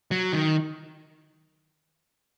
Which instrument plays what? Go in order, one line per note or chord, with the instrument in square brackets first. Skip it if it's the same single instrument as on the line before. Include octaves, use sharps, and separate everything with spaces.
[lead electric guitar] F#3
D#3